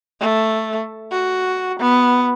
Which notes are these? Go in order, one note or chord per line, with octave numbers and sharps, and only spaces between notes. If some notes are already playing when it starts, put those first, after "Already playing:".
A3
F#4
B3